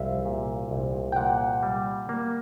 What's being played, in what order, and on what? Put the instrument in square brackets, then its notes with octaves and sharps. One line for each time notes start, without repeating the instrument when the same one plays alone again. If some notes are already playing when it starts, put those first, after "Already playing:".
Already playing: [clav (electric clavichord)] C2 [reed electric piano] E5 F5
[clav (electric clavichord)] A#2
C2
[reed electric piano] G5
[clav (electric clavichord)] A#2 [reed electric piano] F#5
[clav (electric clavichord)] G3
A#3